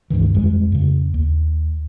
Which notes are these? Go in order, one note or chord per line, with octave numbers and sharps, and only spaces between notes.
C#2 G2 D#3 E3
F2 G3 G#3
F2 C#3
D#2